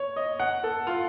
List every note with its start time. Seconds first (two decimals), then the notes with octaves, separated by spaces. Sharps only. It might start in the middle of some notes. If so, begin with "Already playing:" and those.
Already playing: C#5
0.16 D#5
0.40 F#5
0.64 A4
0.87 F4